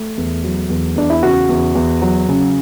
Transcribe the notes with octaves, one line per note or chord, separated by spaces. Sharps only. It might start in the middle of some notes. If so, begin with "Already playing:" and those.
Already playing: A3
E2
F#3
E2
E2 D4
E4
C#3 F#4
E2
E2
F#3
C#3